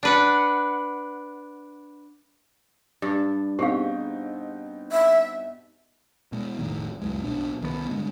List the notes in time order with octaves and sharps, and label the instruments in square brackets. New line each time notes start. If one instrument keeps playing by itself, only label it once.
[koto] D4 B4 F#5
[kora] G2 D4
[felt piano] B2 C4 D#4 [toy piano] G4 G#4 F5
[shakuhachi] E5
[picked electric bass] B2 G#3
F1 C2 A2 D#3
C#2 F#2 G#3
B1 B2 D4
C2 D#3 G3 B3
G2 D3 G#3